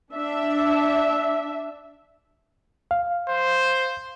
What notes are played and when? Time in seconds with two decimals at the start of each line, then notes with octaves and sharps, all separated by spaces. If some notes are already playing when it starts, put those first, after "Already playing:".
0.12 D4 E5
2.91 F5
3.29 C5